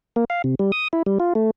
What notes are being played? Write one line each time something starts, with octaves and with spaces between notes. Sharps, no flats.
A#3
F5
C3
G3
D#6
E4
G3
F4
A3